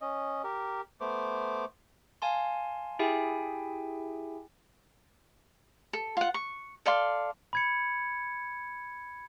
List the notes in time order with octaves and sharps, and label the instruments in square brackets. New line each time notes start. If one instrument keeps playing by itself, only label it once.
[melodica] C#4 D#5
G4 A#4
A3 B3 C5 D6
[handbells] F5 G#5 A5 C6
E4 G4 G#4 E5 G5 G#5
[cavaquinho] A4
F4 F#5
C#6
A4 D5 F5 C6
[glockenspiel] B5 G#6 C#7